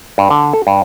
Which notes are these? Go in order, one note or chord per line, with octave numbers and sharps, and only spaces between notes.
G2
D3
A4
G2